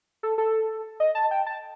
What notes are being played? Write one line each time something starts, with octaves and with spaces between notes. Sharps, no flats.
A4
A4
D#5
A5
G5
A5